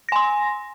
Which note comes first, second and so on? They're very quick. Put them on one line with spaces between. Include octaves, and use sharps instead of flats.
A#6 G#5 C6